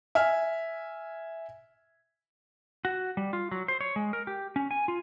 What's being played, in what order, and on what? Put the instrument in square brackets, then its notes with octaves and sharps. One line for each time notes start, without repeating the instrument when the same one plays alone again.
[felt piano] E5 G#5 F6
[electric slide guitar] F#4
G3
F4
F#3
C5
C#5
G#3
A#4
G4
C#4
G#5
F4